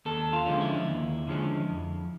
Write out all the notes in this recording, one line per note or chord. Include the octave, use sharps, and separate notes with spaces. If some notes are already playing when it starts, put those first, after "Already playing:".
D#2 A4
F4
D3 F3 G#3 C#4
E4
D#2
D3 F3 G#3 C#4
F2